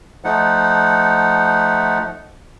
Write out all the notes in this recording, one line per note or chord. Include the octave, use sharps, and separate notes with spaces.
F3 A3 D#4 F#5